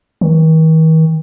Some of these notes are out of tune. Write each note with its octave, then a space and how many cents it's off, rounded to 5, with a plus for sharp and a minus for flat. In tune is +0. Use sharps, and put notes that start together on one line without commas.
D#3 +45